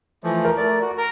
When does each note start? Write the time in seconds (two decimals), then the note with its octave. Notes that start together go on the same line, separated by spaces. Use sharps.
0.24 E3 F3 A3
0.45 A#4
0.57 A3 D5
0.82 F#4
0.98 A#4 A#5